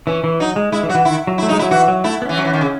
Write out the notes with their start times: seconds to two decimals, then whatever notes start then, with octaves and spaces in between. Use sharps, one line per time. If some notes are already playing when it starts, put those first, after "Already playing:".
0.07 E3 C#4
0.24 E3
0.40 F#3 D#4
0.56 G#3
0.72 G#3 E4
0.83 E3
0.89 F#3 F#4
0.95 E3
1.05 D#3 E4
1.27 F#3
1.38 A3 E4
1.49 G#3 D#4
1.59 E4
1.62 F#3
1.71 E3 F#4
1.88 F#3
2.04 A3 E4
2.22 B3
2.25 E3 C#4
2.37 F#3
2.45 E3
2.53 D#3
2.61 C#3